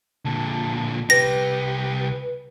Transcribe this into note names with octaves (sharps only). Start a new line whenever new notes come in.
A#2 D3 A5
C2 G4 B4 A#6